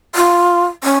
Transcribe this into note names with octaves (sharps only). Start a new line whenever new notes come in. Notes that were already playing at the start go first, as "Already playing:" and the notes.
F4
C#4